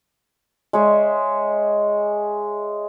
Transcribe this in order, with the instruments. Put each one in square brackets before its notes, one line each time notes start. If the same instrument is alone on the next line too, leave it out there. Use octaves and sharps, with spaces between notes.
[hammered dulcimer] G#3 C#5 E5